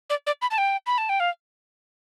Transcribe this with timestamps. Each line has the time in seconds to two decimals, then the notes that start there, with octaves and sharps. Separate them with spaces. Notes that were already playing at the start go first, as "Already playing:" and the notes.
0.10 D5
0.27 D5
0.42 B5
0.51 A5
0.58 G5
0.86 B5
0.98 A5
1.09 G5
1.20 F5